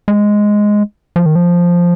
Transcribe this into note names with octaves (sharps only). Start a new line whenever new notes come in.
G#3
F3
D#3
F3